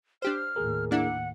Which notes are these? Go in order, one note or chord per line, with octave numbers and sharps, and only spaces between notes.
D4 G4 C5 F6
D#2 A2 G#4 A#4
A#3 D4 E4 F#5